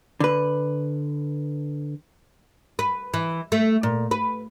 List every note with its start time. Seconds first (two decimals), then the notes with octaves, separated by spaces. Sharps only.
0.20 D3 B4
2.79 B4
3.14 E3
3.52 A3
3.83 A#2
4.11 B4